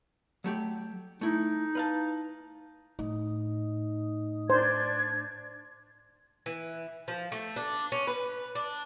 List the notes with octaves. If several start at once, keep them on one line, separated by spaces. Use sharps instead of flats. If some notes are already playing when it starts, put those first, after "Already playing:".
F#3 A3 G4
A3 D#4 E4
B4 F5 A5
A2 D#4
D4 C5 G#6
E3
F3
A3
D4
C#4
B4
D4